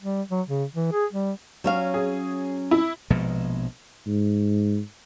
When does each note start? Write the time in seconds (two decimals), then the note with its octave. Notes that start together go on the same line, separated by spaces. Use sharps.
0.02 G3
0.31 F#3
0.48 C#3
0.75 E3
0.92 G#4
1.13 G3
1.64 F#3 C#4 F5
1.94 G#4
2.71 E4
3.10 A#1 B2 F3 G#3
4.07 G#2